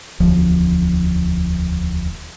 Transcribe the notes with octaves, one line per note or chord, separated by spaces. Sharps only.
E1 D2 F3